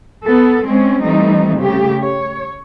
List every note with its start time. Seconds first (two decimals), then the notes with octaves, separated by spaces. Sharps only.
0.23 B3 A4
0.64 G#3 C4 C#4
1.01 E3 G3 A3 C4 D#4
1.58 C#3 A3 G4
2.02 C#5